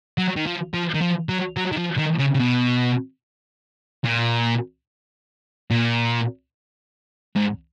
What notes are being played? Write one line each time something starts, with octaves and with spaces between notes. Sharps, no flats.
F#3
D#3
F3
F3
D#3
F3
F#3
F#3
D#3
F3
D#3
C#3
C#3
B2
A#2
A#2
G#2